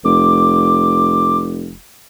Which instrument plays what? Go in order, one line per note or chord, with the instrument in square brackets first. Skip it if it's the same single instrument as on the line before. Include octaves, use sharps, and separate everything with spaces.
[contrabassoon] F1 [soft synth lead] D6